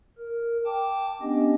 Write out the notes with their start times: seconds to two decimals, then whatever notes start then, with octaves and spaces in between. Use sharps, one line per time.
0.18 A#4
0.66 G5 A5 D6
1.21 B3 C#4 D4 G4 D#5